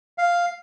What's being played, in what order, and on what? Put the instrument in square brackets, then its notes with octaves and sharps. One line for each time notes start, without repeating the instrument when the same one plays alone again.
[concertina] F5